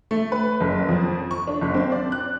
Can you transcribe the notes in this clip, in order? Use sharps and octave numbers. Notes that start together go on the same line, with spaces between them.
A3
B4
F#1
F2
C#6
D4
F#1
C4
D5
F#6